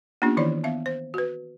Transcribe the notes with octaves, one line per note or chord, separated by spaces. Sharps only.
A#3 B3 C#4 D4 F4 G4
D#3 E3 E4 C#5 D5
B3 E5 F5
C5
F#4 B4